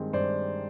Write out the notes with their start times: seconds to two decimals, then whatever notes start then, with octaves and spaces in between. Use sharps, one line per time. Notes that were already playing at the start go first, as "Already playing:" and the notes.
Already playing: G2 D#3 G#3 C4
0.13 G2 C5 D5